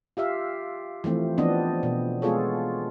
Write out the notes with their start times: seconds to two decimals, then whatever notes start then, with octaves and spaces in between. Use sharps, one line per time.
0.17 F4 G4 E5 F5
1.04 E3 F3 A3 C4
1.38 E3 F3 B3 C4 D4 D#5
1.83 B2
2.22 G#3 B3 F4 G#4 A4 C#5